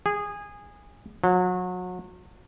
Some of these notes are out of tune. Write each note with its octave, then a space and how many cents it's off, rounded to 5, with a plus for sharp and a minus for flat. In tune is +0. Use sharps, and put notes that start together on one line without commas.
G#4 -20
F#3 -30